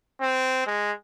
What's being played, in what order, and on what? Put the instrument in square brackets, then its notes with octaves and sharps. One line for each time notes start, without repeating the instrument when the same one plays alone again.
[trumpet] C4
G#3